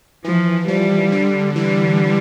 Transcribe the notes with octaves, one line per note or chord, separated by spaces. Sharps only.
E3 F3
F3 G3
D3
E3 G3